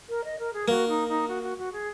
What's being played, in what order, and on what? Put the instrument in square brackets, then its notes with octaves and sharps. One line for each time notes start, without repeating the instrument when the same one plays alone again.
[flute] A#4
D#5
A#4
G#4
[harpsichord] A#3 [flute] F#4
[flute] D#4
D#4
F#4
F#4
F#4
G#4